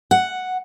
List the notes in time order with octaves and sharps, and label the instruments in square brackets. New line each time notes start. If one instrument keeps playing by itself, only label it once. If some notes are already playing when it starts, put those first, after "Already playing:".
[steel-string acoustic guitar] F#5